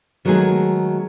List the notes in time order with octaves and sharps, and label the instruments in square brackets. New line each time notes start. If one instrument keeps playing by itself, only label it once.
[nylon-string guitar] D#3 F#3 G#3 A3 B3 G#4